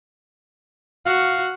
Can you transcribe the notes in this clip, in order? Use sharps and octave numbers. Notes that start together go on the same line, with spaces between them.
F#4 F5